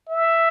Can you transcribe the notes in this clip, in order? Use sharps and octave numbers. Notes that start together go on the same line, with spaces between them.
E5